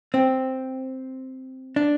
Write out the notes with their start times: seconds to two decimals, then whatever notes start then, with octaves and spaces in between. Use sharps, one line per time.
0.14 C4
1.76 D4